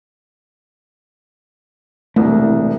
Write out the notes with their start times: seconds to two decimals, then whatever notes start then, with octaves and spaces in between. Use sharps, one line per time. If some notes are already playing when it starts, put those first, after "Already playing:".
2.16 E1 C2 A2 A3